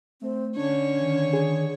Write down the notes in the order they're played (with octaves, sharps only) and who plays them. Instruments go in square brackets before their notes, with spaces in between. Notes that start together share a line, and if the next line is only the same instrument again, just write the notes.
[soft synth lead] A3 [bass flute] C4
[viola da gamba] D3 C#5 [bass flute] C#4 [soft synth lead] D4
[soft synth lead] D#3
[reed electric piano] G#4